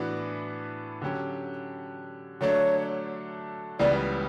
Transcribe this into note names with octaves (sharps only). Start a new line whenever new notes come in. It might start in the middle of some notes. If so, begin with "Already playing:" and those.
Already playing: A2 E3 B3 D4 F#4
D3 F#3 C#4 G4
D3 F#3 A3 D4 C#5
C#2 C#3 E3 G3 B3 D5